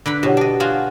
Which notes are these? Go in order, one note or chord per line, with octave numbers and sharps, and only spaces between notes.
D3 B4 B5
B2 G4 C#5 F#5
D4 D#5
F4 F#4 G#4